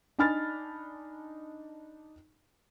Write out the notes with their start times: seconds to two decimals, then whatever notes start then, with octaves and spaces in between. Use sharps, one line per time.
0.19 D4 D#4 G#5 B5 F6 A6